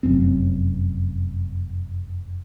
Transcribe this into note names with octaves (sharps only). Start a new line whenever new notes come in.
F1 F#2 C4